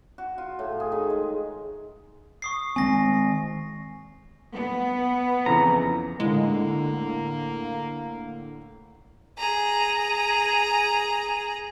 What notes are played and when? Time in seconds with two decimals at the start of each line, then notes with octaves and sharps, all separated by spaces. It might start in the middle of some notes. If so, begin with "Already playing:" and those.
0.18 F#4
0.38 F4
0.59 A2
0.80 G#4
0.92 D#3
1.10 G#3
2.42 C#6 D#6 C7
2.76 D#3 G#3 C4 G#5 A#6
4.55 B3
5.46 F2 C#3 E3 A#5
6.20 A2 D3 G#3 A#3
9.38 G#4 A#5